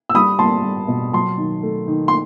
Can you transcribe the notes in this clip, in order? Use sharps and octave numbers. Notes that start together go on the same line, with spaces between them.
E6
G3 B5 D#6
G3 A5 C6
G3
B2
F#3 A5 C6
D#3
A3
D#3
C6